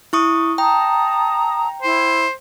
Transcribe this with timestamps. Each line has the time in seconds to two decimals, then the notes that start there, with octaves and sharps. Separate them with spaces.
0.13 E4 C#6 D#6
0.58 G5 A5 A#5 D#6
1.82 E4 C5